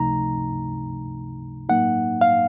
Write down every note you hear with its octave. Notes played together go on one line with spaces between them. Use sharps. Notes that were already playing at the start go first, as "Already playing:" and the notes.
Already playing: C#2 C3 F3 A3 D#4 A#5
A2 F#3 A#3 D#4 F#5
F5